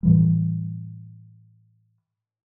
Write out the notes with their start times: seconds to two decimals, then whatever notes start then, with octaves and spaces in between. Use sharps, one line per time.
0.03 A2 E3 G3